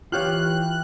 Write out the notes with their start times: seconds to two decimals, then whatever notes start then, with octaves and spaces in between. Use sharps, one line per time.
0.12 E3 F4 G4 C#5 G5 F6 F#6